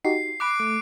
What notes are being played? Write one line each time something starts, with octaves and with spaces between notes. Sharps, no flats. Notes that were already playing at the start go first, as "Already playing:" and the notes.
D#4 F#4 G4 C7
B5 D6 F#6 C7 D7
A3 D7